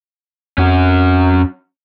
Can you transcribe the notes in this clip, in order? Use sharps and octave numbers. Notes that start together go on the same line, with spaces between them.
F2 C#4 F#4